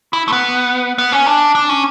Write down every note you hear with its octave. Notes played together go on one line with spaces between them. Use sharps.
E4
A3
B3
B3
C#4
D4
D4
C#4